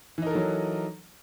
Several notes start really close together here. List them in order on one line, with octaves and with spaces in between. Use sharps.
E3 D#4 A#4 A4 F#3